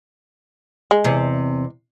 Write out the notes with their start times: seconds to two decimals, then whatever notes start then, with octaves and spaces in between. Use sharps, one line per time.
0.91 G#3
1.04 E2 C3